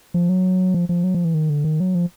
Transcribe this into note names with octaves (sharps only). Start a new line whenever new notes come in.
F3
F#3
F3
F3
F#3
F3
E3
D#3
D3
D#3
F#3
F3